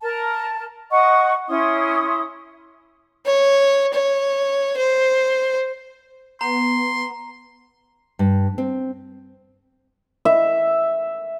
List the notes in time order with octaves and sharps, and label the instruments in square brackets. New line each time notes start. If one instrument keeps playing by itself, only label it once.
[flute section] A#4 A5
D#5 F#5 C#6
C#4 E4 C6 D#6
[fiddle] C#5
C#5
C5
[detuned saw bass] B3 [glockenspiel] A#5 [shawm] C6
[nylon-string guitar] G2
C4
[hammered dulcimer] E5